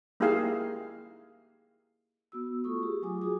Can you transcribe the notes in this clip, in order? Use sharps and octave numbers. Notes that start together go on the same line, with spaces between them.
A#3 D#4 E4 G4 G#4 F5
B3 F#4 E6
A3 F4 A4 C#6 D#6
G4 G#4
F#3 F4 G#5 D6 D#6
F4 F#4 G#4 D#6